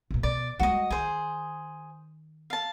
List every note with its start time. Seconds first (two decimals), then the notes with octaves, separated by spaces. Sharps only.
0.11 D#1 B2
0.23 B2 D5
0.59 G3 G#3 F#4 D#5
0.91 D#3 G#4 C5
2.50 F5 A5